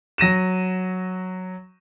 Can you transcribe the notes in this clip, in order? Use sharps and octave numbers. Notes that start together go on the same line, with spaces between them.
F#3 A#6 D#7 E7